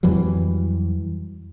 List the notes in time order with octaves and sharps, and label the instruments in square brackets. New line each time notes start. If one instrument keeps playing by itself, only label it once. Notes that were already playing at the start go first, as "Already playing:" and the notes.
[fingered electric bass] F2 E3 F#3 G3